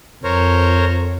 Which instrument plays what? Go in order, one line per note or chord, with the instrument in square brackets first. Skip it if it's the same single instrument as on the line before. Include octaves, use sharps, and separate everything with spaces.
[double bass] F2 [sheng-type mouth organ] A#4 C5 C#5